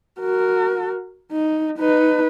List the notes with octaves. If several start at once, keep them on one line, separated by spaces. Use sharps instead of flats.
F#4 A#4
D#4
D#4 B4